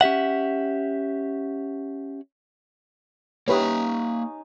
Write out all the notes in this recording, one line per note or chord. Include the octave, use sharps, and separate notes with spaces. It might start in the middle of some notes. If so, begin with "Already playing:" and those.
C#4 G4 E5 F#5
A#3 C#4 D#4 G4 B4 C#5 E5